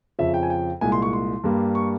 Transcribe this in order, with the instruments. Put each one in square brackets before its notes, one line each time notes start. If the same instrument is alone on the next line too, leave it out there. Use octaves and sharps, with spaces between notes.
[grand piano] F2 C#3 F3 E5
G5
G#5
G5
C2 A#2 G#3 G#5
C6
C#6
C6
G2 G3 A#3
C#6